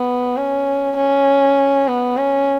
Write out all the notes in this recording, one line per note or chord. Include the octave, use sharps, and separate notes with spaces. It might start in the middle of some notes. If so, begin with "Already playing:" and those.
Already playing: B3
C#4
C#4
B3
C#4